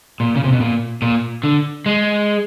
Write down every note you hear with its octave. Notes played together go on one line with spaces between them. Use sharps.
A#2
C#3
C3
B2
A#2
A#2
D3
G#3